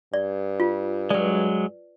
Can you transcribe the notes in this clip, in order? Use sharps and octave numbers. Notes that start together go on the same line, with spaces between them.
G2 D5
F4
F#3 G#3 B4 D5